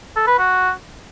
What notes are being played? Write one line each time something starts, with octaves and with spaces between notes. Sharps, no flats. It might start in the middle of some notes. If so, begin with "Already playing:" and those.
A4
B4
F#4